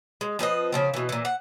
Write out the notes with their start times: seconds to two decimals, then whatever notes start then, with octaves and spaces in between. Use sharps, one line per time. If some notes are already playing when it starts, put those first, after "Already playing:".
0.21 G#3
0.39 F3 C4 B4 D#5
0.72 C#3 F3 C4
0.94 B2 E3
1.09 A#2 E3
1.25 F#5